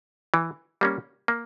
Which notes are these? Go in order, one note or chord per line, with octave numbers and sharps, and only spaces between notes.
E3
G3 A#3 C#4
A#3